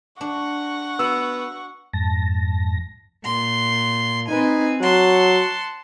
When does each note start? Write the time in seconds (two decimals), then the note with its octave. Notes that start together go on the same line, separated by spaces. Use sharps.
0.21 D4 F#5 C#6
0.99 B3 F#4 E6
1.93 F2 G#2 A5 A#6
3.24 A#2 C6
4.29 C4 D#4 B4 G#5
4.81 F#3 F#5 A5 C6